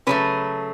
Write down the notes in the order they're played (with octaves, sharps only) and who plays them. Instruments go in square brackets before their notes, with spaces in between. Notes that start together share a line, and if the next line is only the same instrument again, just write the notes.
[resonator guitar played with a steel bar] C#3 F#3 A3 B4